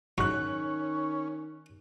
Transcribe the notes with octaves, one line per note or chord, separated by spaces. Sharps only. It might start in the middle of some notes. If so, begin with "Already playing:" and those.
G#2 D#3 F#3 C#4 C#6 F#6